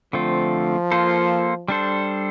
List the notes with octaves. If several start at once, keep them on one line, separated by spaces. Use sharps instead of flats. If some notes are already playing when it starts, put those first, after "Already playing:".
D3 F3 A3 C4 F4
A#3 F4 A4 C5
G3 D4 A4 C5